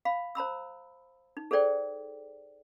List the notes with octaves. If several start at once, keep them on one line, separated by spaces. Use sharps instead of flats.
F5 B5
C5 A#5 B5 E6
D#4
G#4 A4 C5 D5 G5